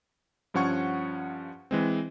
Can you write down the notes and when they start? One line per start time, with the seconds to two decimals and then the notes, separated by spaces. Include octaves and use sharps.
0.54 G2 F3 C#4 F#5 C#6 G#6
1.71 E3 G#3 C4